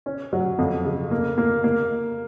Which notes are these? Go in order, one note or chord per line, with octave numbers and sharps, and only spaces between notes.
C#4
F#3
F2
C#3
A#3
A#3
A#3